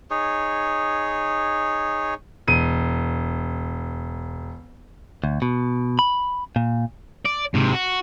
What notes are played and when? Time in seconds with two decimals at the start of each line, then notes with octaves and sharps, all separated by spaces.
0.10 D#4 G#4 C#5
2.47 E1 D#7
5.24 D2
5.42 B2
5.99 B5
6.56 A#2
7.26 D5
7.54 G#2 C3
7.73 F#4